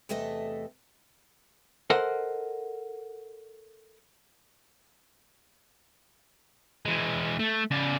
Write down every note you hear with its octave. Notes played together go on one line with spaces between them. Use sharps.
E2 C3 A3 A4 D#5 E5
A4 A#4 C5 D#5 F#5
E3 G#3
A3
C#3 D5